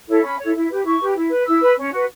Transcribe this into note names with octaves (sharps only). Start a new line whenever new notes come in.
E4 A4 C#5
C#4 B5
E4 A4 C#5
E4
G4 B4
E4 C#6
G4 B4
E4
B4
E4 E6
B4
C#4
F#4 B4